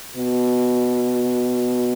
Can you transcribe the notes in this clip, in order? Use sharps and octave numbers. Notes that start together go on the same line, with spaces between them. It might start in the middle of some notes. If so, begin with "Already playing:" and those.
B2